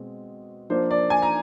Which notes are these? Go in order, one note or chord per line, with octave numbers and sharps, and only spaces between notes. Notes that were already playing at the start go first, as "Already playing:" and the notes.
Already playing: B2 G#3 C4
F3 A#3 D4 F4 C5
D5
G#5
A#5